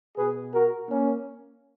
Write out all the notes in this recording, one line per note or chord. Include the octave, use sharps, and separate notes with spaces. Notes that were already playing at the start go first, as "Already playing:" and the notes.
B2 G#4 B4
F#4 A#4
A#3 C#4